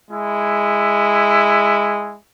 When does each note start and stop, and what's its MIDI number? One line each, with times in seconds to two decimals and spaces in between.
0.10 2.19 56
0.10 2.19 64